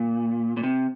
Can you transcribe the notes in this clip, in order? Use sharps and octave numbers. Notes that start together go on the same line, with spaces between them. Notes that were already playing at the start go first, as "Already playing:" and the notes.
Already playing: A#2
A#2
C3